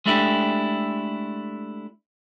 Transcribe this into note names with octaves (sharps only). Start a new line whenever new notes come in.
G#3 A3 D4 E4 G4